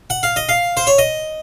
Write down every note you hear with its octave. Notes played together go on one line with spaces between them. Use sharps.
F#5
F5
D#5
F5
C5
C#5
D#5